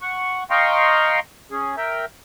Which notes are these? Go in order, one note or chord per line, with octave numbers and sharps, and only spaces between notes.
F#5 C#6
D#5 F5 G5 A#5 C6 C#6
C#4 G#4
A#4 E5 G5